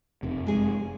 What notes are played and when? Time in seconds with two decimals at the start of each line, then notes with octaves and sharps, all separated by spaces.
0.23 F#1 F2 C3
0.47 G#3 G#4